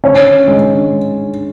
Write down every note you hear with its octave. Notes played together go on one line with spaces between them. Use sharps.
C#4 C#5
G#3